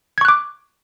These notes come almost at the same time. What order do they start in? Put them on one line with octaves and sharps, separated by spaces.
G#6 C#6 F#6 D6